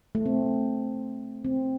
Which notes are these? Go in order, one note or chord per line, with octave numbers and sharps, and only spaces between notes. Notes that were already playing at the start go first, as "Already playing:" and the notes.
A3
C4
C4